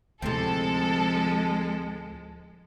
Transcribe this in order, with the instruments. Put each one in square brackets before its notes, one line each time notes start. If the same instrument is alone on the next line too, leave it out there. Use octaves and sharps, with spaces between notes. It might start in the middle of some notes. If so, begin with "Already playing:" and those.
[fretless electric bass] D2 A2 [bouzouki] C3 C4 [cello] F3 G#3 [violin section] A4